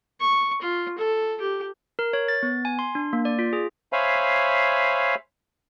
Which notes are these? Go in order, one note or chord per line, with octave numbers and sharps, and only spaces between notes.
C#6
F4
A4
G4
A#4
C#5
A6
B3
G#5
C6
D4
A#3
D5
F4
G#4
C5 C#5 E5 F5 G#5 B5